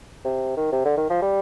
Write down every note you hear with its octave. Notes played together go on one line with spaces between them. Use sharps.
C3
D#3
C3
D3
D#3
F3
G3